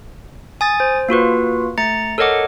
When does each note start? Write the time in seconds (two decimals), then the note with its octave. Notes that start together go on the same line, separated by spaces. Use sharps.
0.61 G#5 D#6 A6
0.80 C5
1.09 A#3 F4 F#4 B4
1.78 A3 A#5 A6 C#7
2.18 A4 A#4 C#5 D#5 F#5 D6